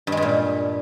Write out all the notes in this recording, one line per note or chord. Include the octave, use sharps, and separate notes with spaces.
G2
G#3
G2
A#2